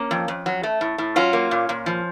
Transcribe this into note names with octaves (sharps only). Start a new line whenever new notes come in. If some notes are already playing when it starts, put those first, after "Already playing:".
Already playing: A#3 C#4
F2
F2
F#3
A3
A2
A2
F#3 C#4 F4
A#3
A#2
A#2
F3